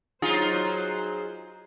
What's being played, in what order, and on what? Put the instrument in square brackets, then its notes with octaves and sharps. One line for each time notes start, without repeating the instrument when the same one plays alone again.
[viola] F#3 C5 [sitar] D#4 F4 G#4